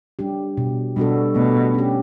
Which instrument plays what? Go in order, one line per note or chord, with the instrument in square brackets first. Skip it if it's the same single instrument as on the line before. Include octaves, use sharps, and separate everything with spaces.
[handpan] G3 D4 G4
B2
[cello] B2 [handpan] G3 D4 F#4 A4
[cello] B2 [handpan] A3
[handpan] C#4 G4